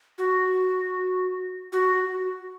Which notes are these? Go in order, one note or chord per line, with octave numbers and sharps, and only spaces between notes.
F#4
F#4